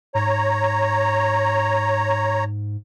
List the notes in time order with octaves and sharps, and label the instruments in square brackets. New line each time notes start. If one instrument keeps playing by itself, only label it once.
[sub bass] G#2 [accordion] C#5 A#5